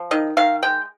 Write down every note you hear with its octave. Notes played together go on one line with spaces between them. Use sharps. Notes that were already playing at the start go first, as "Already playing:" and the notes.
Already playing: F3
D#3 D#5
D#3 F5
G#3 G5